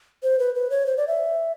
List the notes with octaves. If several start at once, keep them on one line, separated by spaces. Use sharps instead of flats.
C5
B4
B4
C#5
C5
D5
E5